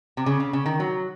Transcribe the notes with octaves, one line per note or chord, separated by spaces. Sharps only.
C3
C#3
C#3
C#3
D#3
F#3